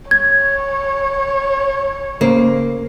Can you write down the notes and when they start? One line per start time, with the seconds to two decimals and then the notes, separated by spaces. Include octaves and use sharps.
0.11 C#5 G#6
2.21 C#3 A#3 C5